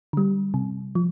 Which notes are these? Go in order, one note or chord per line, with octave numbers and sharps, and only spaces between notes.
D3 G3
C3
F3